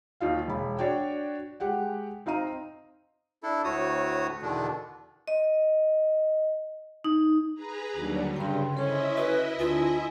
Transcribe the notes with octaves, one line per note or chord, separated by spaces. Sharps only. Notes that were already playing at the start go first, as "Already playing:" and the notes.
D#2 D#4 F4 F5
E1 B5
D4 F#4 C#5 D5 G5
G#3 G4 F#5 G5
C4 D#4 F5 A#5 D#7
D4 E4 A4
D2 A2 A3 F#4 C#5 D#6
E2 B2 D3 D#3 D4
D#5
D#4
G#4 B4 A#5
D#2 D3 F#3 G3 D4 F#4
G2 C#3 G5 C6
C#4 E4 A4 C5 D#5 E5 C6
F#4 B4
D2 F4 G#5